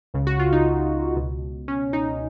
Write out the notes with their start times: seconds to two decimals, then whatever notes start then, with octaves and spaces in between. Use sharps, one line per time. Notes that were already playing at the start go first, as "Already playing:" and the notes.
0.14 C#2 C#3
0.27 F#4
0.39 F4
0.53 D#4
1.16 C#2 B2
1.68 C#4
1.93 D#4